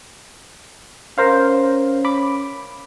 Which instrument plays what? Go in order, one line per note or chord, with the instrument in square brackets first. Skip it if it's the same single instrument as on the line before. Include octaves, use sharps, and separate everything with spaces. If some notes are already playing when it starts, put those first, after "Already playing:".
[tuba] C#4 [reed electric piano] A#4 C5 F5
[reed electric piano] B5 D6